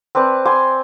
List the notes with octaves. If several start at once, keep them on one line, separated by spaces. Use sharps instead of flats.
C4 B4 D5 A5
G#5 C6 D6